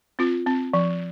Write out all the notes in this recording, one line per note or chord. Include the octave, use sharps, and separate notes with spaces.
C4 F4
C4
F3